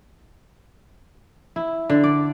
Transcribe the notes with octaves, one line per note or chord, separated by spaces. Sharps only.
E4
D3
D5